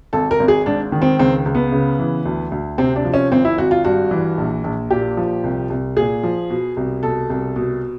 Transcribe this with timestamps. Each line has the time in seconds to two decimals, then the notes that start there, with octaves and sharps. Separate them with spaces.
0.13 G#1 A4
0.31 A#4
0.40 G#1
0.48 G#4
0.66 G#2 D4
0.92 D#3
1.02 C4
1.19 C#2 C4
1.45 C#2
1.55 B3
1.72 C#3
1.99 E3
2.25 D2
2.52 D2
2.78 C3 C4
2.96 D4
3.05 F3
3.14 C#4
3.31 G#1 C4
3.45 E4
3.58 G#1 F#4
3.71 F4
3.85 G2 F#4
4.11 E3
4.38 A#1
4.64 A#1
4.91 A#2 G4
5.17 F3
5.44 C2
5.70 C2
5.97 A#2 G#4
6.23 F3
6.50 B2
6.77 C2
7.03 B2 A4
7.30 C2
7.56 B2